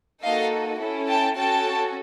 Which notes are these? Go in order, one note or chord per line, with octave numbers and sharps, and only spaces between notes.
A#3 D#4 F#4 A4 D#5 F5
C#4 E4 A4
G5 A5
C#4 F#4 A4 G5 A5